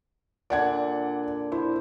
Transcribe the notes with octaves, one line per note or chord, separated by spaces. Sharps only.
A#2 D3 D5 F#5 G#6
E4 C5